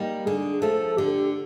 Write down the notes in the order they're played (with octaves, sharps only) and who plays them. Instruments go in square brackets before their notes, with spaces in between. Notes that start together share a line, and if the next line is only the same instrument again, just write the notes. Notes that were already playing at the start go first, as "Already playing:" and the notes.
Already playing: [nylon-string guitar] G3 A#3 D#4
[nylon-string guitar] D3 [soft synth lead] G#4
[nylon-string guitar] F3 A3 [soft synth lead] A4
[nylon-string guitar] D3 [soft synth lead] G4